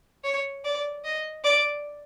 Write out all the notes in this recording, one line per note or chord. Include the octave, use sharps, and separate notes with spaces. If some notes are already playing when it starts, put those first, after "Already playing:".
C#5
D5
D#5
D5